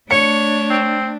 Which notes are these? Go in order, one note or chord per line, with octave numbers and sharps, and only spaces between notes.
A3 D4 C#5 C#7
C4